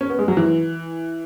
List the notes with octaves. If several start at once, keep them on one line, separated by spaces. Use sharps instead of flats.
C#4
B3
G#3
F#3
E3